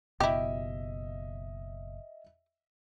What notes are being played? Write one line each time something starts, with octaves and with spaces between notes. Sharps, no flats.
F#1 B2 E4 G4 D#5 E5